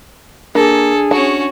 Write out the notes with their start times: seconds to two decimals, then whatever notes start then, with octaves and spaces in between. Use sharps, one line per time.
0.55 A#3 D4 G#4 A4
1.11 C#4 F#4 A5